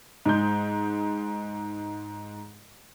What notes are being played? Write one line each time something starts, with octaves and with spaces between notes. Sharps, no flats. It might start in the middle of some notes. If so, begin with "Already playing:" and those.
G#2 G#3 G6